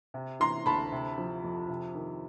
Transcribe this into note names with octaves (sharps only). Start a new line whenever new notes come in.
C3
E3 A#5 C6
D2 A5 B5
C3
F3
F2
C3
D#3